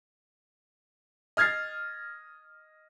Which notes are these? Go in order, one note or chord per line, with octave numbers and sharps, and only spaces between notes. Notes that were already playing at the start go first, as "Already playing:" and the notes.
D#5 F6 G#6 A6 C7